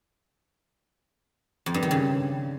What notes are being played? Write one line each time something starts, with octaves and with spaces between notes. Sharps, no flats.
F2
G2
D#3
C#3